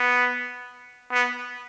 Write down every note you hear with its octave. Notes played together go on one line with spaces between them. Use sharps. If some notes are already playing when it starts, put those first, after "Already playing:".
Already playing: B3
B3